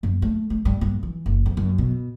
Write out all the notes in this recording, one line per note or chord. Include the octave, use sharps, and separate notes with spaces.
F#2
A3
A3
G2
G2
E3
F#1
F2
F#2
B2